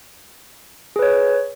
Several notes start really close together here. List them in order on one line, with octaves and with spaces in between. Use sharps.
G#4 B4 C#5